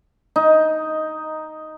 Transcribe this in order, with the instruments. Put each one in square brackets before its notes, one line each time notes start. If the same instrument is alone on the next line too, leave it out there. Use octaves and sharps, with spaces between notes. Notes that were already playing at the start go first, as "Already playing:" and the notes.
[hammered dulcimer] D#4